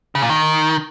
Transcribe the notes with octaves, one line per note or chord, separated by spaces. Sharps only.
C#3
A#2
D#3